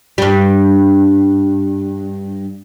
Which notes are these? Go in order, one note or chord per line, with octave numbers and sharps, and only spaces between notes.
G2 G3